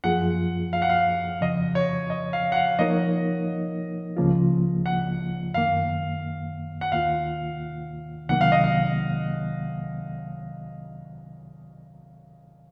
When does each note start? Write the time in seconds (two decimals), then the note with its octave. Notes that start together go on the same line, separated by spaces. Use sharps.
0.04 F#2 F3 A#3 F4 G#4 F#5
0.73 F5
0.82 F#5
0.89 F5
1.41 F2 C#3 F3 D#5
1.75 C#5
2.10 D#5
2.33 F5
2.52 F#5
2.56 F5
2.79 F3 A#3 D#4 A#4 C#5 D#5
4.17 C#2 C#3 F3 A#3 F4
4.86 F#5
5.54 F#2 D#3 A#3 F5
6.81 F#5
6.92 D#2 D#3 A#3 F4 F5
8.29 C2 C3 D#3 F#3 A#3 F#5
8.41 F5
8.52 D#5
8.64 F5